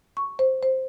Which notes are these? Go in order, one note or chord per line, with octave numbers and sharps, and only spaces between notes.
C#6
C5
C5